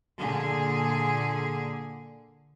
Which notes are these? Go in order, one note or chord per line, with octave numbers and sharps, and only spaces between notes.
A#2 D3 G#4